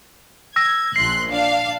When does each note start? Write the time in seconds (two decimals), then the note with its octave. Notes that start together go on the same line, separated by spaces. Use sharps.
0.56 E6 G#6 A#6
0.96 A#1 C6 F#6 C7
1.31 D4 F5